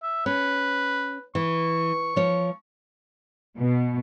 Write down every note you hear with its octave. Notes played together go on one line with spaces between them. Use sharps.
E5
C#4 B4
E3 C#6
F3 C#5
B2